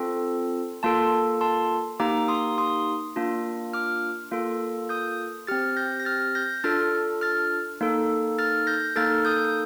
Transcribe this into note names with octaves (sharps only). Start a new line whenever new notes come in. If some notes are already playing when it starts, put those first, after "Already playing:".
Already playing: C4 F4 A4
A#3 F4 A4 A5 C6
A5 C6
A#3 D#4 G4 A#5 D6
C6 D#6
C6 D#6
A#3 D4 F4
D6 F6
A#3 F4 A4
D#6 G6
C4 G4 F6 A6
G6 A#6
A#6
F6 A6
G6 A#6
D4 F4 A4 F6 A6
F6 A6
A#3 D#4 A4
F6 A6
G6 A#6
A#3 D#4 A4 F6 A6
D#6 G6